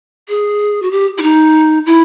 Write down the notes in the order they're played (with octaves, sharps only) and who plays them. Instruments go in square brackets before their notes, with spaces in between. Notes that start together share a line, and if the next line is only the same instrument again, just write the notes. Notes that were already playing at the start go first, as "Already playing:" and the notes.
[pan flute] G#4
F#4
G4
E4
D#4
E4